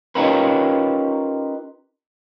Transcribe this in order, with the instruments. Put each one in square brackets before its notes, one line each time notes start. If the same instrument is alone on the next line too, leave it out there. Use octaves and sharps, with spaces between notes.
[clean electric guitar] C#4 D#4 F4 G4 A#4 B4